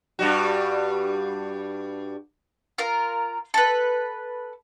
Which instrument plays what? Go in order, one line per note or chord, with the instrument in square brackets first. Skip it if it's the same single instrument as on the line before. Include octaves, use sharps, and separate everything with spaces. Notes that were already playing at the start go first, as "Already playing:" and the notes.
[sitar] G2 G3 F#4
[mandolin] F4 A#4
A4 B4